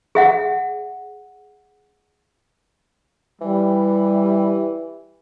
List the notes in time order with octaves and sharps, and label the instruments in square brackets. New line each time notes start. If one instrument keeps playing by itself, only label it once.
[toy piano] G#4 E5 F#5
[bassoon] E3 [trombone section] G3